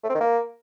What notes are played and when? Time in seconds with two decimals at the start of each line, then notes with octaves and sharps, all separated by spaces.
0.04 A3
0.09 C4
0.15 D#3
0.20 A#3